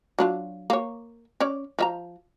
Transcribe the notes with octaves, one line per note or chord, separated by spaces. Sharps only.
F#3 D4 F4
A#3 C#5
C#4 C#5 D5
F3 E5 A#5